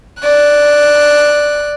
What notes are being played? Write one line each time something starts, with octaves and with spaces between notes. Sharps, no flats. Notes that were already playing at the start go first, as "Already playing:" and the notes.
D5 F#6